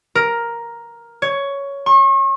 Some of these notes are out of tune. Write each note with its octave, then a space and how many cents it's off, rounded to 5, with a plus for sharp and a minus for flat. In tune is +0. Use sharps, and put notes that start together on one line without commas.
A#4 +5
C#5 +10
C#6 -40